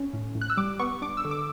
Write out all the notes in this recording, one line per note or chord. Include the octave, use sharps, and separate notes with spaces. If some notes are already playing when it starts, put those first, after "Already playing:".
Already playing: C#4
A2
A2
F#6
E6
G3 D6
B3 C#6
D4 D6
E6
D3
D6